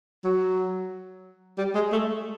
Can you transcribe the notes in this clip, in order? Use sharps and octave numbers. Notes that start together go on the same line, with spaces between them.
F#3
G3
G#3
A3